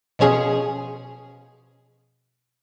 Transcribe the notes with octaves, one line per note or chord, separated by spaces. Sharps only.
B2 F3 C#4 G#4